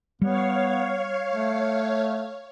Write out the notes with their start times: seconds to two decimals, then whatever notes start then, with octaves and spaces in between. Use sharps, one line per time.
0.22 G3 B3 C#5 F5
1.33 A3